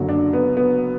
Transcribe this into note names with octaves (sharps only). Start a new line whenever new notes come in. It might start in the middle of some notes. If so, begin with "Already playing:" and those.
Already playing: F#1 F#2 D3 F#3
D4
B3
B3